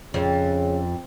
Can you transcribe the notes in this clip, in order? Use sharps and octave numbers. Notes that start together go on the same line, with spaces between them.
F2 C#3